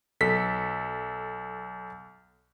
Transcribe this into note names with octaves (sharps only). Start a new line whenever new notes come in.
B1 A4 B6